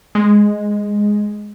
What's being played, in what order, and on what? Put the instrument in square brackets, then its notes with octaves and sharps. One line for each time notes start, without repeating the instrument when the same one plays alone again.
[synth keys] G#3 D#5